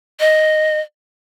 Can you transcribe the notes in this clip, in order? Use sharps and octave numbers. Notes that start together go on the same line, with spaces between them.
D#5